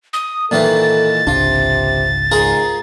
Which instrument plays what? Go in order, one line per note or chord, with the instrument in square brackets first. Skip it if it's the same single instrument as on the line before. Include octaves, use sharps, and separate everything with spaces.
[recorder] D#6
[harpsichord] A#2 D#3 E3 [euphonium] A4 [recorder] A6
[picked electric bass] G#1 C#2 D4 [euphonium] C3 [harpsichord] F4
[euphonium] G#2 [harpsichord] F4 G#4 A#4